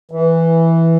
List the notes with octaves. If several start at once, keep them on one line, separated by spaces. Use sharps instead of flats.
E3